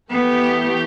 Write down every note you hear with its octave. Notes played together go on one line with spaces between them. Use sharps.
E3 A3 B3 G4